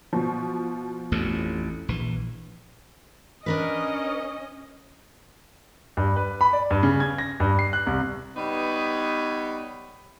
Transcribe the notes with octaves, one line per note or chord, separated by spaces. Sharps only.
B2 F3
A1 F2 A2
A#1 E3
C#4 D4 A#4 B4 D#5
G2
B4
B5
D5
G2
C#3
G#6
A#6
G2
C7
F#6
C2
G3 B3 D#4 B4 C#5